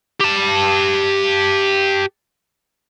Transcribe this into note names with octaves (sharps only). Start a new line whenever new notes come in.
G4 A5